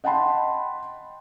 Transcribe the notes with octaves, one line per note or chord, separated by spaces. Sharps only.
D#5 F#5 G5 A5 B5 C6